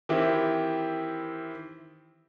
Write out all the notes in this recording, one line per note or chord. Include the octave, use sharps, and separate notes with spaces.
D#3 E3 C4 E4 G4